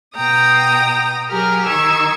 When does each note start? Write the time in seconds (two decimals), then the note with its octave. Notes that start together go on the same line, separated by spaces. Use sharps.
0.14 B2 G5 A#5 D#6
1.29 F#3 G4 G#4 A#4 F6
1.65 D#3 C#6 E6 G#6